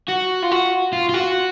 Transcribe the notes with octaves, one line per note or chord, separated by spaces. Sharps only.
F#4
F4
F#4
F4
F4
F#4